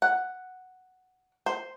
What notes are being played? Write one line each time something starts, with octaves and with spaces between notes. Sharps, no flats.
F#5
C5